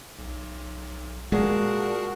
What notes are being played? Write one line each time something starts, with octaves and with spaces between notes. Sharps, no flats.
B1
A#2 G#3 F#4 G#4 A#4 A5